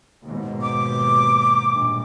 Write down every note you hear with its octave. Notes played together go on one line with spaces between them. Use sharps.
D#2 G#2 B2
D6
A#1 G2